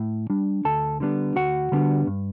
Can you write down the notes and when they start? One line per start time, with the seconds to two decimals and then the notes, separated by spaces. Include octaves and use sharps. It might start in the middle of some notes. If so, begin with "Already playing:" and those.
Already playing: A2
0.30 G3 D4
0.65 D2 A4 A5
1.00 D3 G3 B3 D4
1.36 D2 F#4 F#5
1.72 D3 G3 B3 D4
2.07 G2